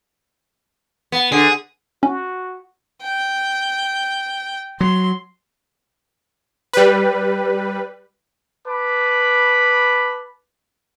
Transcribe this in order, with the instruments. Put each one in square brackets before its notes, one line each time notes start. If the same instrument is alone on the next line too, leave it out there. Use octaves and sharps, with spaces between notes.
[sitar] B3
[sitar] D3 [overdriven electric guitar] G#4
[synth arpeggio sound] C#4 [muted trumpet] F#4
[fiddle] G5
[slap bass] F#3 [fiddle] C6
[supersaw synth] G3 B4
[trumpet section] B4 A5 B5 D6